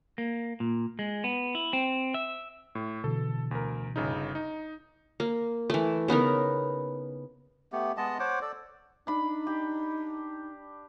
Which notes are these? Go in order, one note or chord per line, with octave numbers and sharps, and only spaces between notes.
A#3
A#2
G#3
B3
E4
C4
E5
A2
B2 D3 E3 A4
D2 A#4
G1 C#3 D#4
D#4
A#3
E3 A3
C#3 B3 D#4 A#4
A3 B3 G4
G#3 B3 D#5 A5
C5 C#5 F#5 D6
A4 D5
D4 D#4 B5
G4